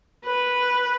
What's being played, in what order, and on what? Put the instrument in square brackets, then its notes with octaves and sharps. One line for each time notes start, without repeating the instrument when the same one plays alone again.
[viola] B4